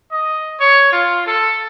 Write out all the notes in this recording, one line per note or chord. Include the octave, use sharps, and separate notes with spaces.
D#5
C#5
F4
A4